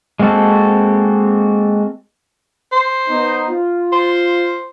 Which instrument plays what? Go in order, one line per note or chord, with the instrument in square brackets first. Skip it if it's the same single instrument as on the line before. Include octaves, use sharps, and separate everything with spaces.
[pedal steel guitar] G#3 A#3 C4 F#4 A4
[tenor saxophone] C5
[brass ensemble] B3 D#4
F4
[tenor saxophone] C5